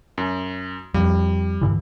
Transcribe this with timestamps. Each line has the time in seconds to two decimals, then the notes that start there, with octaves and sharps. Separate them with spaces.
0.18 F#2
0.94 F2 G3
1.62 G2 D3 E3